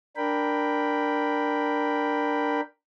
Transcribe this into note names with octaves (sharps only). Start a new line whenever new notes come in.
D4 A#4 G5 B5